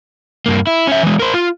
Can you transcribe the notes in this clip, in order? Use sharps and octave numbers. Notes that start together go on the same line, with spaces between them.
G2 A#3
E4
C#4 E5
E3 G#3
A#4 C5
F4